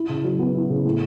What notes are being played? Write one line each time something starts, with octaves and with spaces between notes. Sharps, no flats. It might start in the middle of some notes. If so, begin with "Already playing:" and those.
Already playing: E4
C#3
F#3
B3
E4
C#3
A2